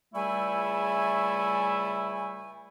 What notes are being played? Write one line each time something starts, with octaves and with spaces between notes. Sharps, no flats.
C#2 G3 A3 E4 E5 G#5